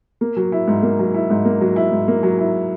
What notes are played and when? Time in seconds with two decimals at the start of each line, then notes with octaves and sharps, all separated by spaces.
0.21 A#3
0.37 F#3
0.52 E4
0.68 G#2
0.83 A#3
0.99 F#3
1.14 E4
1.30 G#2
1.45 A#3
1.61 F#3
1.76 E4
1.92 G#2
2.08 A#3
2.23 F#3
2.39 E4